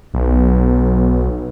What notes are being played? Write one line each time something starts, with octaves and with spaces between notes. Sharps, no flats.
B1